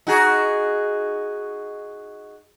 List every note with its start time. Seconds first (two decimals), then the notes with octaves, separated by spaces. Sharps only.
0.07 D#4 F#4 G#4